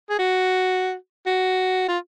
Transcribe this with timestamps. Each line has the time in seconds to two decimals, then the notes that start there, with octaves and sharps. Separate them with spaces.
0.10 G#4
0.19 F#4
1.27 F#4
1.88 F4